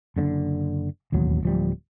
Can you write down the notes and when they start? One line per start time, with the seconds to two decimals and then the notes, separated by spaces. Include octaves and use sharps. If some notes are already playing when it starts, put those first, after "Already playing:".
0.16 F#1 D3 C#4 D4
1.12 E1 A1 D#2 F#3
1.43 D1 F3 G3